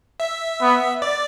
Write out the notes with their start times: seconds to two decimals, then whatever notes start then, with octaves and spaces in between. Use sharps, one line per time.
0.20 E5
0.61 B3
1.02 D5